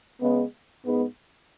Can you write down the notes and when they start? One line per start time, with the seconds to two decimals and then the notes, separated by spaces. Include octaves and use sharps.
0.21 C#3 G#3 B3
0.83 G#2 G#3 B3